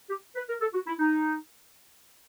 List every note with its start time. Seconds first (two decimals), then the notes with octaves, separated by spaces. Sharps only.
0.10 G4
0.35 B4
0.49 A#4
0.61 A4
0.74 F#4
0.87 E4
0.99 D#4